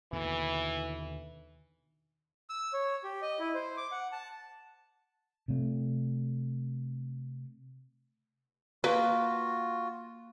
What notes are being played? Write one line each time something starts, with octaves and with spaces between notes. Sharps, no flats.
D#2 B2 D3 E3
E6
C#5
G4
D#5
E4
C5
D6
F#5
A5
C3 A3
A#3 F4 F#4 B4